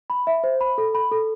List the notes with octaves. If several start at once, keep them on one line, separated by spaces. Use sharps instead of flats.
B5
E5
C5
B5
A4
B5
A4